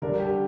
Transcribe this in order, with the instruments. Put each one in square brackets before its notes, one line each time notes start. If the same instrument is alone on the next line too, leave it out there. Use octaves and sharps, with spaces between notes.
[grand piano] D3 G3 D4 [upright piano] A#4
[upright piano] G4